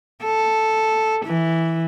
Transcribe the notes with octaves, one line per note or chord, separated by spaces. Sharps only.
A4
E3